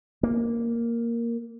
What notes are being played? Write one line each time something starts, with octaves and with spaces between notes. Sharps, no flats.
A#3